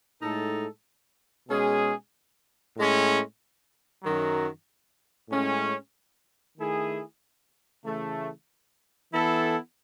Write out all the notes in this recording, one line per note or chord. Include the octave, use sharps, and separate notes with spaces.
A2 G#3 D#4 A4
B2 G#3 C#4 G#4
A2 G#3 C#4
F#2 D#3 F#3
A2 G#3 C#4
D#3 A3 E4 G#4
C#3 E3 A3
E3 B3 E4 A4